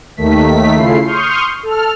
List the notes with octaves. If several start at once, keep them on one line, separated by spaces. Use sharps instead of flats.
D#2 D#3 A3 B6
C#3 A3 E4 F4 C7
C6 C#6 D#6 F6 G6
A4 F6